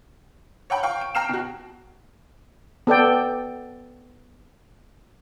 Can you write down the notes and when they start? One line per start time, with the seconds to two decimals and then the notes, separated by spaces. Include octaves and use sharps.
0.70 C#5 F#5 G5 B5
0.83 F5 G5 C#6
1.01 D7
1.15 G5 A#5 F6 C7 E7
1.29 B2 F#4
2.87 B3 A4 D5 G5